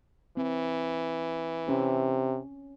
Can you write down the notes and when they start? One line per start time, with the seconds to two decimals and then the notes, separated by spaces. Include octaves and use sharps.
0.37 E3 C4
1.68 C3 C#4